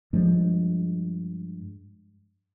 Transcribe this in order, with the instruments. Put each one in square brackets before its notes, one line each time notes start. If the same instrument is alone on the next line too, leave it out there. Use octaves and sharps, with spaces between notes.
[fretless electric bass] G2 F3 G#3